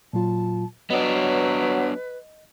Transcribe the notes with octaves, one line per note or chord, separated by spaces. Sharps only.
A#2 F#3 F4 A5
F#3 B3 D4 B4 D#5